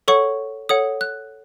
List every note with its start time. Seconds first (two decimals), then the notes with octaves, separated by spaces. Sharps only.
0.08 A4 C#5 F#5 C#6
0.69 A4 C#5 F#5 D#6
1.01 F#6